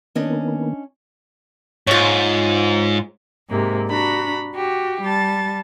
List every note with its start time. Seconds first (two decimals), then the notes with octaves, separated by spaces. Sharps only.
0.15 D#3 A#3 B3 C#4 D4 D#5
1.87 G#2 F4 C#5
3.50 G#2 C3 A#3
3.88 D4 F#4 A#5 B5
4.55 F#4 G4
5.02 G3 A5 A6